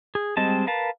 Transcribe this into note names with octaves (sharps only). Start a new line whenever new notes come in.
G#4
G3 G#3 C4 D#5 A5
A#4 B4 F5 A5